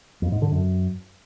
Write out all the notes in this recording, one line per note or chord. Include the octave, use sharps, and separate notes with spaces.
F2
G#2
D3
F#2